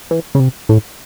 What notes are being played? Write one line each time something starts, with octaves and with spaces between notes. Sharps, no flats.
E3
C#3
C3
A2